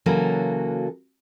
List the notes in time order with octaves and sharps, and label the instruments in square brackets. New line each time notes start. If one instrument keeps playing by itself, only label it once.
[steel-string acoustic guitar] C#3 E3 F#3 A#3 F#4 A4